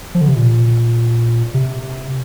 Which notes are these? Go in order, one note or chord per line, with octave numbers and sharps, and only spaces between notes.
F3
D3
C3
A#2
C3